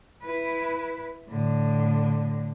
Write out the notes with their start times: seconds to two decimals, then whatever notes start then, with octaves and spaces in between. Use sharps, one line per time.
0.23 E4 B4
1.28 A2 D3